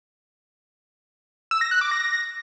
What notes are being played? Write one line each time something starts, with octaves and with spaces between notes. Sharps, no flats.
E6
A#6
F#6
D6
A#6